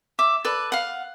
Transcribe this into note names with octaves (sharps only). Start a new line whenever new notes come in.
E5 D6
A4 B4 D5
F5 F#5